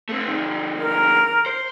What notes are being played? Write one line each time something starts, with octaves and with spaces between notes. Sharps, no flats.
A3 C4
C3 D#3
A#4
C5